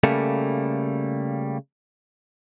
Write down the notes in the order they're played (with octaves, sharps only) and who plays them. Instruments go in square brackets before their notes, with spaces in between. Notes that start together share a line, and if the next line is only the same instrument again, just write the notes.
[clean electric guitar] C#3 G3 A3 A#3 A4